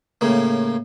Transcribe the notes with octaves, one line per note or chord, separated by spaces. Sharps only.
A2 C#3 A#3